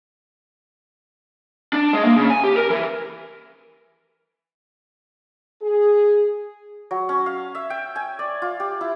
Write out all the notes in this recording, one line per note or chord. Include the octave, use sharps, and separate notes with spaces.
D4
G#3
A#3
C#3
G#5
G4
A#4
E3
G#4
F#3
C#4
F5
E5
G5
G#5
D5
F4
G4
E4